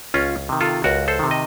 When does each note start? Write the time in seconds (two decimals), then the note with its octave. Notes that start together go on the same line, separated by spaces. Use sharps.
0.14 C#2 C#4 F4
0.49 C3 D#3
0.61 F4 A4
0.84 C#2 F#4 A#4
1.08 A4 C5
1.19 C3 D#3
1.31 D#5